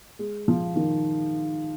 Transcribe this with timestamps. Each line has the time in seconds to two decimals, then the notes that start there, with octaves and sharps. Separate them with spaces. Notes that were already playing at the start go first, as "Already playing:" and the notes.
0.19 G#3
0.48 F3
0.76 D#3